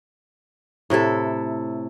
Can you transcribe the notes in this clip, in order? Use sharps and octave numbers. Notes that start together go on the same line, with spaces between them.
A2 C3 E4 A4